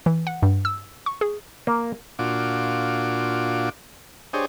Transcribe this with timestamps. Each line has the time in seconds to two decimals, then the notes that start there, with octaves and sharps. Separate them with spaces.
0.06 E3
0.27 F#5
0.43 G2
0.65 E6
1.06 C#6
1.21 G#4
1.67 A#3
2.19 A#2 D4 F4 F#4 D6
4.33 D4 G4 G#4 C5 C#5 D#5